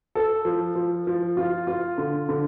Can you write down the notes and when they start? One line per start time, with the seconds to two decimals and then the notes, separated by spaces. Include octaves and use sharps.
0.15 A4
0.45 F3
0.75 F3
1.07 F3
1.37 F4
1.67 F4
1.98 D3
2.29 D3